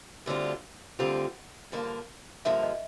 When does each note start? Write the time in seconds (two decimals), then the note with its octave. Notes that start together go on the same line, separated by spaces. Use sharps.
0.26 D2 D3 G3 C4 F4
0.99 D2 D3 G3 C4 F4 F#5
1.72 G2 D3 F3 A#3
2.45 G2 D3 F3 A#3 E5
2.63 D#5